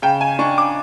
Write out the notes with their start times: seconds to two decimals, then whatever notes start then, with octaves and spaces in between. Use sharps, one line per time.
0.02 C#3 G5
0.21 G#5
0.39 D4 C#6
0.58 D6